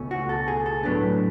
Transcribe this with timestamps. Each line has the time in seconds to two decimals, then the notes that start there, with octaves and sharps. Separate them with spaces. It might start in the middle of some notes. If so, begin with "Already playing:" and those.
Already playing: C#2 B2 A3 C#4
0.11 F#4
0.29 A4
0.48 G#4
0.66 A4
0.83 A2 F#3 B3 D4